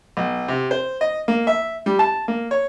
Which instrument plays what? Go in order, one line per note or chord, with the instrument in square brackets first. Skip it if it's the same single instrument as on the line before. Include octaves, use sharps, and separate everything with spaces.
[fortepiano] B1
C3
C5
D#5
A#3
E5
G3
A5
A#3
C#5